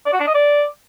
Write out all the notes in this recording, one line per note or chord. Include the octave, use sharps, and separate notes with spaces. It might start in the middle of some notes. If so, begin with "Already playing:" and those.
D5
F#4
D4
D#5
D5